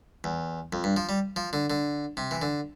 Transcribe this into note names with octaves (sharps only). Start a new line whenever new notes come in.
E2
F2
G2
F3
G3
F3
D3
D3
C3
E3
D3